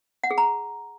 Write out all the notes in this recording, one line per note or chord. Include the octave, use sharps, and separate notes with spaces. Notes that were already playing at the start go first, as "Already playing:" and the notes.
F#5
G#4
A#5